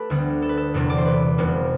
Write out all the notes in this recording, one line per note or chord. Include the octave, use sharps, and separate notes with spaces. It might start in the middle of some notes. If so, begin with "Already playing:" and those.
Already playing: A3 G4 A4 B4
D2 D3 G3 B3
A4
B4
A4
E1 E2 C3 E3
D5
C5
B4
F1 F2 C3 G3 B3